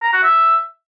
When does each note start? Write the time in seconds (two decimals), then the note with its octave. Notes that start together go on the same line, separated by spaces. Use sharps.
0.03 A#5
0.13 F#4
0.24 E5